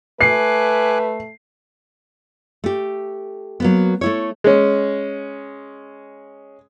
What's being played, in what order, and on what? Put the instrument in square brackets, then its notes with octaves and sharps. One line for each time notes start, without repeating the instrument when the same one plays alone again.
[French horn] A3 [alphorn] B4 [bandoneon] G#5 D6 F#6 [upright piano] C7
[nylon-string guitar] A3 G4
F#3 A#3 B3
A3 E4 C#5
[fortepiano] G#3 C#4